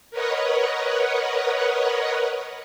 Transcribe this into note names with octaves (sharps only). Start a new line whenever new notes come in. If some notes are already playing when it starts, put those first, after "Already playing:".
A#4 B4 C#5 D#5 F#5